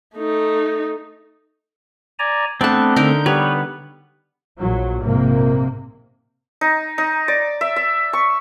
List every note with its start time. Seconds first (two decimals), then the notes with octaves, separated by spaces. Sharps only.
0.15 A3 D#4
2.19 D5 G#5 A#5
2.61 A3 B3 C4 D4 D5 A5
2.96 D3 D#4 A#4 G6
3.26 G3 B3 B4 C#5
4.60 A#1 F#3
5.04 A#1 G#2 C3 A#3
6.61 D#4
6.98 D#4
7.28 D5
7.61 E5
7.76 E5
8.13 C#6